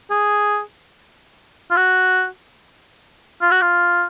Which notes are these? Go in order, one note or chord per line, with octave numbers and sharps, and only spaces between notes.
G#4
F4
F#4
F4
F#4
F4